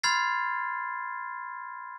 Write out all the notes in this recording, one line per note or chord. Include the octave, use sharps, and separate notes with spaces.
B5 C6 F6 G#6 A6 C7